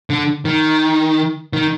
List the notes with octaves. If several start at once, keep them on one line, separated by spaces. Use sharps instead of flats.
D3
D#3
D#3